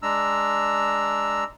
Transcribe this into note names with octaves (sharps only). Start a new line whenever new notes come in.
G#3 D4 A#5 E6